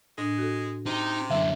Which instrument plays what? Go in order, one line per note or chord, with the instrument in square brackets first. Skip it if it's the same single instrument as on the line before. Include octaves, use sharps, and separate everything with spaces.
[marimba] A2 D4 [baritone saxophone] G#3
[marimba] F#4 A4
[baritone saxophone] C3 [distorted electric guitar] D#4
[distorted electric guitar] F#2 D3 [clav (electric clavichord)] E5